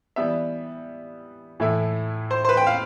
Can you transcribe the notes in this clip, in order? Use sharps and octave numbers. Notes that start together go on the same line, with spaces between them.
E3 G3 B3 E5
A2 E3 A3 E4
C5
C5
B4
G5
F5